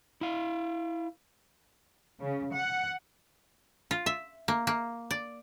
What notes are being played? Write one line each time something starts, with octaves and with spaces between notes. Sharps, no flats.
E4 F5
C#3
F#5
F4
E5
A#3
A#3
D5